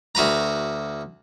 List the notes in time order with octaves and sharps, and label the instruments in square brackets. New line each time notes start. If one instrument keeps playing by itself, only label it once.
[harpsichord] D2 F#4 B4 A#5